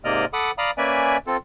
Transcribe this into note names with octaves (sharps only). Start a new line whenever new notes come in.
G#2 C3 A#3 D5 D#5 F6
A4 F#5 B5 D6 D#6
D5 F5 A#5 B5 D#6
A#3 C#4 B4 D5 E5 G#5
C4 F4 A4